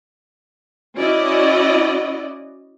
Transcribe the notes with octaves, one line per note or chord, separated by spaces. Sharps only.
C#4 E4 F#4 D5 D#5